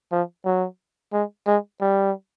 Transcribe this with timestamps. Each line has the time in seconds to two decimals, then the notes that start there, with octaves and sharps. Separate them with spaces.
0.12 F3
0.45 F#3
1.13 G#3
1.47 G#3
1.81 G3